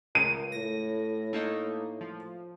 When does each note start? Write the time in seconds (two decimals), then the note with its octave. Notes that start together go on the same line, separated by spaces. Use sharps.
0.15 C#2 A#4 D#7
0.52 A2 A#6
1.33 A3 A#3 D#4
2.01 F3